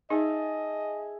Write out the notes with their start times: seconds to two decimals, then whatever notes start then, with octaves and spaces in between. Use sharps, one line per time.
0.10 D#4 G#4 D#5 E5 A5